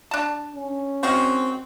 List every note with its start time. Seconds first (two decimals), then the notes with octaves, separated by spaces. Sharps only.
0.11 D4 A5
0.56 C#4
1.03 D#3 G#3 C4 F#4